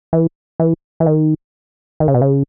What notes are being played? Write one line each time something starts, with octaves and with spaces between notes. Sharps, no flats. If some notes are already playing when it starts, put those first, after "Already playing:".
E3
E3
E3
D#3
D#3
C#3
B2
C#3